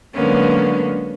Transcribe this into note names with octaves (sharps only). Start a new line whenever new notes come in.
D3 F#3 G#3 A#3 B3 C#4